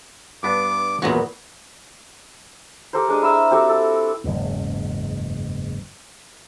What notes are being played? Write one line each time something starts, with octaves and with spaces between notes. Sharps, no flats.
G2 B3 D4 D6
E2 A#2 F#3 B3 F#4
G4 A4 A#4 C5
G#3 D4 D#6
E4 A#4 E6
C4 F#4 G4 A4
A4
F#1 E2 G#2